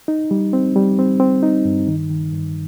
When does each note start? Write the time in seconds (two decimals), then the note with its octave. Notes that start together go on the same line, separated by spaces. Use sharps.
0.08 D#4
0.31 G3
0.53 C4
0.76 G3
0.99 C4
1.20 C4
1.43 D#4
1.65 G2
1.87 D#3
2.10 D#3
2.33 G2